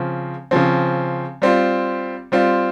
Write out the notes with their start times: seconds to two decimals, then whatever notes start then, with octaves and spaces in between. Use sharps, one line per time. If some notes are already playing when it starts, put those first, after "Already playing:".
Already playing: C#3 F3 C4
0.51 C#3 F3 C4
1.42 G3 C4 F4
2.32 G3 C4 F4